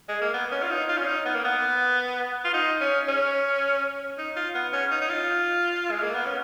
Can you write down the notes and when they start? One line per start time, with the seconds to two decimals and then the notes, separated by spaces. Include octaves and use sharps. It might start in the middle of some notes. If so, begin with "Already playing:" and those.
0.09 G#3
0.21 A#3
0.34 B3
0.52 C#4
0.63 F4
0.71 D#4
0.89 F4
0.98 C#4
1.07 D#4
1.25 B3
1.35 A#3
1.44 B3
2.45 F4
2.54 D#4
2.81 C#4
3.08 C#4
4.18 D#4
4.36 F4
4.55 B3
4.73 C#4
4.91 D#4
5.01 D#4
5.10 F4
5.91 G#3
6.03 A#3
6.14 B3
6.26 C#4